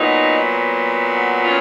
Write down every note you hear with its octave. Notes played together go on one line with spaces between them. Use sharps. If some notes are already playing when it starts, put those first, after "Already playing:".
Already playing: A#2 F#3 B3 D#4
C#4 F4